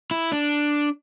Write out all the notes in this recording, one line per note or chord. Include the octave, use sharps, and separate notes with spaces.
E4
D4